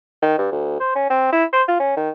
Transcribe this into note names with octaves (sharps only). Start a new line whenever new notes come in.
D#3
G2
D2
C5
C#4
C4
E4
C5
F4
C#4
D#3